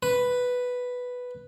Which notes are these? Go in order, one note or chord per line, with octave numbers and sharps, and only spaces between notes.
B4